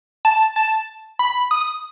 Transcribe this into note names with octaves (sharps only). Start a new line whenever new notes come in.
A5
A5
B5
D#6